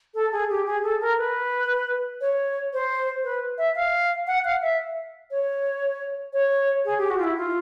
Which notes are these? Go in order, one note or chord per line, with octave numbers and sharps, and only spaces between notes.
A4
G#4
G4
G#4
A4
A#4
B4
C#5
C5
B4
E5
F5
F#5
F5
E5
C#5
C#5
G#4
G4
F#4
F4
E4
F4